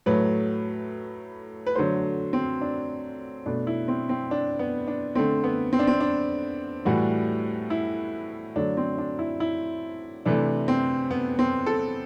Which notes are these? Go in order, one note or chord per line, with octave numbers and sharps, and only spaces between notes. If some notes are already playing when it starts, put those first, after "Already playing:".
A2 F#3 A3 B4
B4
D3 F#3 A3 C5
C4
D4
B2 A3 D4
E4
C4
C4
D4
B3
D4
D3 A3 C4
B3
C4
D4
C4
D4
A2 E3 G3 F#4
E4
D3 F#3 A3 D4
C4
D4
E4
E4
C3 E3 A3 D4
C4
B3
C4
A4